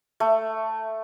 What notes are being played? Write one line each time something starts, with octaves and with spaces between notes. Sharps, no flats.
A3